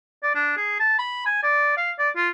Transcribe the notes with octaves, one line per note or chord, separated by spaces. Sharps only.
D5
D4
G#4
A5
B5
G#5
D5
F5
D5
F4